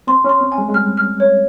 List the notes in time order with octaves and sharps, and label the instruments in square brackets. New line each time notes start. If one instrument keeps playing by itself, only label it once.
[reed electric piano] C4 [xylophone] C6
[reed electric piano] C#4
[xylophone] C6
[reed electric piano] C4
[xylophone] G#5
[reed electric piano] G#3
G#3
[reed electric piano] G3 [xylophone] F6
[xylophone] F6
C#5